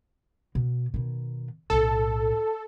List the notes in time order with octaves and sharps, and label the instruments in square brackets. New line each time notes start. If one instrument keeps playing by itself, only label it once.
[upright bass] B2
B2 D#3
[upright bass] B1 A2 [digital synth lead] A4